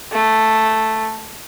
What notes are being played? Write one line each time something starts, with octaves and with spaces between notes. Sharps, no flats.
A3